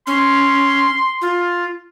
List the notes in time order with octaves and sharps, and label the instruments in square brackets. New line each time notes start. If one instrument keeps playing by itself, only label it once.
[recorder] C#4 [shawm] C6
[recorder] F4